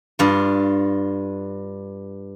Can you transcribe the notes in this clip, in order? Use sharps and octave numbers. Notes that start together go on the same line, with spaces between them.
G2 F4